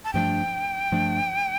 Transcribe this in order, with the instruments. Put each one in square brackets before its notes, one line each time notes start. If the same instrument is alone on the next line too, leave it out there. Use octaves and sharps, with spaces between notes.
[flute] A5
[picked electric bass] G2 F3 A3 D4 [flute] G5
[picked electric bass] G2 F3 A3 D4